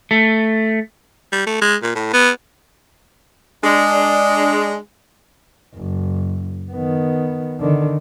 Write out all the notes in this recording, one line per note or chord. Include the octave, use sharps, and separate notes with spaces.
A3
G3
A3
G#3
A#2
A2
B3
G#3 D4
F#1
D#3 B3
D3 D#3